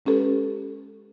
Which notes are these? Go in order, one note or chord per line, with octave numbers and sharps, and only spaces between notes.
G#3 C#4 G4 A4 B4